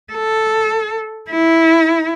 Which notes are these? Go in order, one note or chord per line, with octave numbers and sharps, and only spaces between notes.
A4
E4